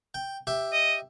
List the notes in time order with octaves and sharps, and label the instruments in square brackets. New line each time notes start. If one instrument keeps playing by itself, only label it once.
[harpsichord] G5
G4 E5
[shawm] D#5